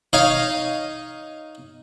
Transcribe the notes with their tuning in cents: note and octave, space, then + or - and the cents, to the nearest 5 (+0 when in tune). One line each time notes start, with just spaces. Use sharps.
D#4 +0 C#5 +0 F5 +0